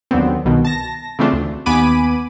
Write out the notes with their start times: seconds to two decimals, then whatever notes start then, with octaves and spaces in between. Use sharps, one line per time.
0.11 D#2 D3 F#3 B3 C4
0.45 C2 B2 D#3
0.65 A5 A#6
1.19 C#3 E3 A3 C4 D4 F4
1.33 D2
1.66 D#2 B3 G#5 B5 D6 D#7